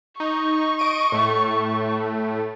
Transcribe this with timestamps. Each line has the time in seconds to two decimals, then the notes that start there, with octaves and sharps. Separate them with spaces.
0.20 D#4 C#6
0.79 D#5 D7 D#7
1.12 A2 A3